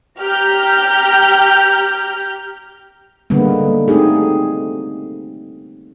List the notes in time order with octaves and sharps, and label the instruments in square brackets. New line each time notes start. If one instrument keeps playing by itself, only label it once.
[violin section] G4 A#5 F6 G6
[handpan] D3 G3 G#3 A#3 B3
A3 C4 D#4 G4 G#4